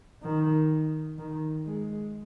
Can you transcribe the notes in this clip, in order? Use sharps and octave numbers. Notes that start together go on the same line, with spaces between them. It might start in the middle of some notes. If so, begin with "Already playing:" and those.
D#3
D#3
G#3